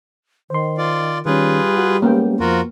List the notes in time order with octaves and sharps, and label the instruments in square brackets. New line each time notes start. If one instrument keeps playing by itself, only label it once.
[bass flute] D#3 [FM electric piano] C5 C6
[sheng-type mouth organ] F4 D5
[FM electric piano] D#3 C#4 [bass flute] G3 [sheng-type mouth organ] F4 G#4 B4
[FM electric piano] F#4 F#6
[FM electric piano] G#3 C#4 [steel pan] A#3 B3 G5
[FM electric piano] F2 [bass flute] F3 [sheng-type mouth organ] F4 F#4 A#4